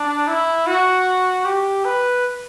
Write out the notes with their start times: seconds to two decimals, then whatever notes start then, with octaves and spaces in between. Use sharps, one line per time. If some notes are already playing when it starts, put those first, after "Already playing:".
Already playing: D4
0.28 E4
0.67 F#4
1.45 G4
1.84 B4